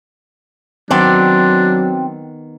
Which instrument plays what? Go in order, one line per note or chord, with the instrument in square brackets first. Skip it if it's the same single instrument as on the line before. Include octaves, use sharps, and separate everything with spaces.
[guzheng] D#3 B3 D5 [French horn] F#3 [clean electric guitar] C4 [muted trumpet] D4